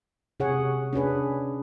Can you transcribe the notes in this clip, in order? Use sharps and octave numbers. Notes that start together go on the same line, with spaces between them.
C3 G#4 C#5 F#5
C#4 D4 G#4 B4